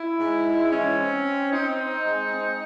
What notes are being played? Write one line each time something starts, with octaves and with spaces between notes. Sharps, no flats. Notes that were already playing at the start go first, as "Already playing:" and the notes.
Already playing: E4
G#2
G#3
E3 C#4
C4
C4
C4 D#4
C4
G#3
C4